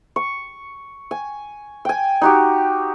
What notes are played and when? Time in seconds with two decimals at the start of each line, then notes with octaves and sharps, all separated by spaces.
0.16 C#6
1.11 G#5
1.85 G5 G#5
2.21 D#4 F#4 G4